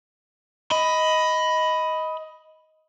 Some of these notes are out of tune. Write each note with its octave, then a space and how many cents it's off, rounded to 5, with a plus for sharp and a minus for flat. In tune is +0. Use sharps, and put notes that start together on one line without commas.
D#5 +15 B5 +5